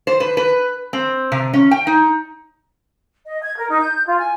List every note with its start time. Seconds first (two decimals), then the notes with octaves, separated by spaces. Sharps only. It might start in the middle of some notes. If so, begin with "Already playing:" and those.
0.07 C5
0.20 B4
0.37 B4
0.93 C4
1.32 C3
1.53 C#4
1.71 G5
1.87 D#4
3.26 D#5
3.42 G#6
3.57 A#4
3.69 D#4
3.81 G6
4.06 F4
4.19 G#5